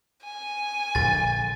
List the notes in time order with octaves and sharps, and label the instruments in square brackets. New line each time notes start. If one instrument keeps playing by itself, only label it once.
[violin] G#5
[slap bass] A#1 D3 [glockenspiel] A6